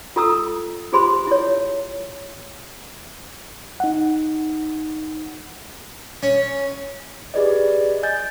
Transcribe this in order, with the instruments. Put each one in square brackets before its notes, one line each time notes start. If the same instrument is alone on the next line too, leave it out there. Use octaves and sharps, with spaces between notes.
[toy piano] F4 A4 A#5 D#6 E6
F4 G4 G#4 C5 B5 C6
E4 C#5
[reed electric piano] D#4 F#5
[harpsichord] C#4
[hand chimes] G4 G#4 B4 D5 D#5
D#5 G#5 G6 A6